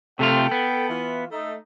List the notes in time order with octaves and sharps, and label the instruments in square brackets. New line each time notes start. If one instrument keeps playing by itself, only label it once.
[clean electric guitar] C3 A3 F4 [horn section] A4 G5
[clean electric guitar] B3
[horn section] E3 F4
A3 D#4